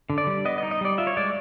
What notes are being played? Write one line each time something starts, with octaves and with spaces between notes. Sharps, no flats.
D3
D5
G3
B3 D#5
D#5
D#4
D#5
G3 D5
F4 E5
C#5
G#3 D5